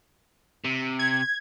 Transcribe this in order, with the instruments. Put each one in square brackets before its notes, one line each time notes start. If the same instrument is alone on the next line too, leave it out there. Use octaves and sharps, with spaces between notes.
[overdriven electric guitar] C3
[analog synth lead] G#6